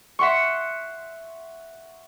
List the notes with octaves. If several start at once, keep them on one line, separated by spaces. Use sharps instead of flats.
E5 F#5 C6 C#6